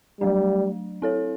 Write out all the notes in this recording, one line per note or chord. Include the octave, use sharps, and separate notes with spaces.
F#3 G3 A3 D4
C4 E4 A4 C#5